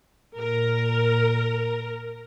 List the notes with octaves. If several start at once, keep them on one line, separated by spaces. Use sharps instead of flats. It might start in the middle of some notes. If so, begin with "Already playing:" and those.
A#2 A#4